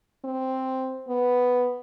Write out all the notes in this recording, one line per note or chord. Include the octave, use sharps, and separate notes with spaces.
C4
B3